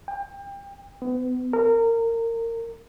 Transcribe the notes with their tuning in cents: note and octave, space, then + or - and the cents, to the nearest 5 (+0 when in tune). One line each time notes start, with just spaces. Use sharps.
G5 +30
B3 +35
A#4 -25